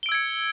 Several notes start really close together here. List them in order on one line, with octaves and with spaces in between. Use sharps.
G7 D7 E6 G#6 C#7